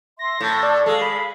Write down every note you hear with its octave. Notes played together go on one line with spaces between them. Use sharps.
E5 C6 A#6
A2 A4
D5
G#3 A4 F5
B5